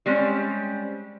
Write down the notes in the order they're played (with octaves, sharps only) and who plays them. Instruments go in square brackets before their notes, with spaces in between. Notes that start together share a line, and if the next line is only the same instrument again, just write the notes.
[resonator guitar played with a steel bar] G3 G#3 C4 C#4